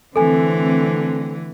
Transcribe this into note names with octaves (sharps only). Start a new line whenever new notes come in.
D3 E3 A3 C4 A4 G#5